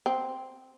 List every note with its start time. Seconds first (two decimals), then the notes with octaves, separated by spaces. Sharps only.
0.06 C4